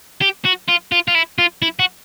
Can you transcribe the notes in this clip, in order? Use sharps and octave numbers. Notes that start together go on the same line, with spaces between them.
G4
F#4
F4
F4
F4
E4
F4
E4
F#4